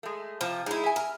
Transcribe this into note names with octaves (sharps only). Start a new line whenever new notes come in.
G#3 A3
C3 F3
G#3 D#4 E4
E5 G#5
A#4